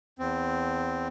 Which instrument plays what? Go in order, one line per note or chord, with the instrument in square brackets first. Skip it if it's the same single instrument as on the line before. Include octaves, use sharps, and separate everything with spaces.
[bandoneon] E2 C4